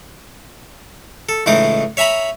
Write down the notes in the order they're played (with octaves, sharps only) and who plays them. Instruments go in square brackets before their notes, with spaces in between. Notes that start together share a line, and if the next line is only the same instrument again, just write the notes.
[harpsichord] A4
C#2 A2 E3 D#4 D6 D#6
C#5 E5 G#5 A#5 B5